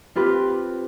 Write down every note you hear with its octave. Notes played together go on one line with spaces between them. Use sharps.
C4 F4 G4 B4